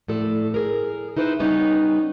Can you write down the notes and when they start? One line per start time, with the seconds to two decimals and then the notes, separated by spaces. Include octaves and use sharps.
0.08 A2 F3 A4 D5
0.54 G#4 A#4
1.17 D#4 E4 B4 C5
1.39 C#3 G3 B3 C#4 D#4 A#5